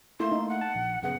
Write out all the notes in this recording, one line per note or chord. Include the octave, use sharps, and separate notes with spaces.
A3 A#3 E4 C6
D#4
F#5
A5
A#1
F#2 C#3 B3 F#5